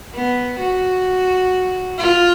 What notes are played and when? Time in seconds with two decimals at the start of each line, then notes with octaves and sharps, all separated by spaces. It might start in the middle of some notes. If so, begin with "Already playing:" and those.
0.14 B3
0.60 F#4
1.98 F4